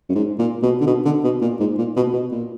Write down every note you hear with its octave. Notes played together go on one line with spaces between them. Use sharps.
F#2
G#2
A#2
B2
D3
B2
D3
B2
A#2
G#2
A#2
B2
B2
A#2